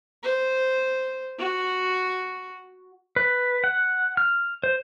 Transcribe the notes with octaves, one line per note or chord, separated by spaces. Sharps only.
C5
F#4
B4
F#5
F6
C5